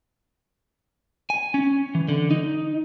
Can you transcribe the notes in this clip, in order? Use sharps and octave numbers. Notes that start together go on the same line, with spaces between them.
G#5
C#4
E3
D3
D#4